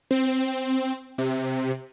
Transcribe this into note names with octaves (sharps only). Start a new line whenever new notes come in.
C4
C3